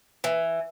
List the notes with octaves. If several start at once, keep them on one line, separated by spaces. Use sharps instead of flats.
E3